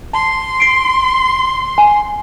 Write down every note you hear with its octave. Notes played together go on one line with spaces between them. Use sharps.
A5 C6
C7 D7
G#5